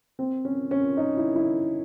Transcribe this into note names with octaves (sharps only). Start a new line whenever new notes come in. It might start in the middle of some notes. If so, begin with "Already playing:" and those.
C4
C#4
C#4
D#4
E4
E4